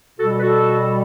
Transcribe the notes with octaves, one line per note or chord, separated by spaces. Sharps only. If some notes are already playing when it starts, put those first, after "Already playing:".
B2 G3 F#4 A4
B4
F#4 A4